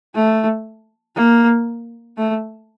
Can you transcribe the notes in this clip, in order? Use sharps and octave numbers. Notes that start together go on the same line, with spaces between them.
A3
A#3
A3